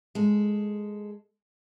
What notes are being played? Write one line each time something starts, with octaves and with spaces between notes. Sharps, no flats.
G#3 A4